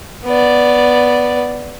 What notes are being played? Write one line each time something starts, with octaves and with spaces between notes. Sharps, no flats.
B3 D5